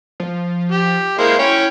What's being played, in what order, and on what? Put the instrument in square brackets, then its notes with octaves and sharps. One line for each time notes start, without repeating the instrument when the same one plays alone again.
[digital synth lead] F3
[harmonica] G4
[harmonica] G#3 A#3 C5 [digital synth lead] E4
[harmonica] C#4 C#5 G5